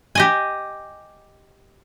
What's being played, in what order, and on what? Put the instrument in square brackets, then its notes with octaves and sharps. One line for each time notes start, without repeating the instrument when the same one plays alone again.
[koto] G4 D#5 G#5